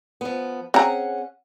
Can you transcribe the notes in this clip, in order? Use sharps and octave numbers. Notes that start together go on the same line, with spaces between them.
F3 B3
C4 C#4 G#4 F#5 A#5